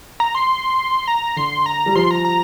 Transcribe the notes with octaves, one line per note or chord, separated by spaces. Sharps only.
A#5
C6
A#5
D3 C6
A#5
G3
F3 C6
A#5
A#5